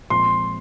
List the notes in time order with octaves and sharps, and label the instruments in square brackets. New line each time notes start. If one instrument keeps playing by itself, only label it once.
[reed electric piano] A#2 F3 G#3 C4 [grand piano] C6